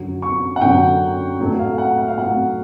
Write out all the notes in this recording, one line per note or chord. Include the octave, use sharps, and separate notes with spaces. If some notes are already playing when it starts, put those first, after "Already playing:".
Already playing: F#2 D3 F#3
C#6
F#5
F#2 D3 F#3 G5
A2 F#3 A3
F5
F#5
F#5
F5
A2 F#3 A3 F#5